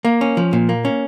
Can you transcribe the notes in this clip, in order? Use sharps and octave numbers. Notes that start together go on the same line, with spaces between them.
A#3
C#4
F3
A#2
A#3
C#4